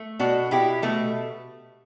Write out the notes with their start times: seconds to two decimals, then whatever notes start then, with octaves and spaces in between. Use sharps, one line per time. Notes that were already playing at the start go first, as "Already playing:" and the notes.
Already playing: A3
0.19 B2 D4 F#4
0.51 B2 E4 G4
0.82 B2 A3